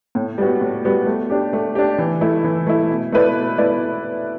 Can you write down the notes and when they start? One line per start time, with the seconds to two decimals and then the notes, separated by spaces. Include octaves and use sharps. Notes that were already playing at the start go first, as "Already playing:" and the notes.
0.15 A2
0.38 G3 B3 F#4
0.61 A2
0.84 G3 B3 F#4
1.06 A3
1.30 D4 G4
1.53 A3
1.75 D4 G4
1.98 E3
2.21 A3 E4
2.44 E3
2.67 A3 E4
2.90 B2
3.12 A3 E4 B4 D5
3.36 B2
3.58 A3 E4 B4 D5